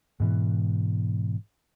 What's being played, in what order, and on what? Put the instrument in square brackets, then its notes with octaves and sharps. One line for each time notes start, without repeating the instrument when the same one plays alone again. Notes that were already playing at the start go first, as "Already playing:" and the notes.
[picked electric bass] G#2 B2 E3